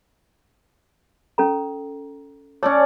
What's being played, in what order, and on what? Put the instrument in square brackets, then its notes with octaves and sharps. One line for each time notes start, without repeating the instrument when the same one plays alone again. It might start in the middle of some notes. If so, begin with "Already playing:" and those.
[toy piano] C#4 A4 A#5
[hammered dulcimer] C#4 D5 A5 [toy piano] C#5 D6 E6